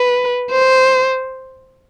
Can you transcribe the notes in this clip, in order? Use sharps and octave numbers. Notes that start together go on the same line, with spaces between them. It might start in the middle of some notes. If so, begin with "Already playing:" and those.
Already playing: B4
C5